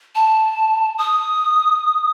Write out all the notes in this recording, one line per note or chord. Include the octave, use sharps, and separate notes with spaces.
A5
D#6